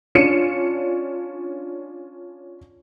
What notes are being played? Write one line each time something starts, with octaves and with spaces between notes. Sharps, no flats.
C#4 D4 F4 C#7 D#7 E7